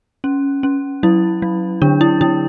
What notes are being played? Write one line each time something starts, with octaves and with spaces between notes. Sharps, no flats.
C#4
C#4
F#3 E4
F#3
D3 D4
E4
D3 E4